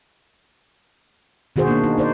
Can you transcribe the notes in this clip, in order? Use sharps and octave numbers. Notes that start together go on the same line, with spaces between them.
B2 D#3 F#4 G#4 C5
A#3 D4
D#4
D#4 C5 D5